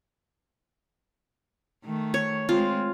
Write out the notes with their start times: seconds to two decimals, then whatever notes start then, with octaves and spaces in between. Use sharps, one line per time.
1.85 D#3 A3
2.14 C#5
2.49 G#3 C4 F4